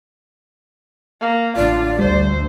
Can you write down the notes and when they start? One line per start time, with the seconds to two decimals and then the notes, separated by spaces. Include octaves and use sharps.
1.20 A#3
1.56 A1 D3 F4 D5
1.99 D2 G3 C5